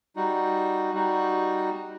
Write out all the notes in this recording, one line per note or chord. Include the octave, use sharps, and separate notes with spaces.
G3 D#4 F#4
G3 D#4 F#4